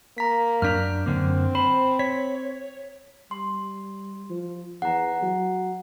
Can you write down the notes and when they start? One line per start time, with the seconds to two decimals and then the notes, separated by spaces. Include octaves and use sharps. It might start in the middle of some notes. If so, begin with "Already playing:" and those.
0.18 A#3 A#5 B6
0.62 F#2 D4 A#5 F6 G6 B6
1.06 F#2 D3 A#3 C4
1.55 C5 B5
1.99 C#5 B6
3.31 G3 C6
4.30 F3
4.82 E2 F#5 A#5
5.23 F#3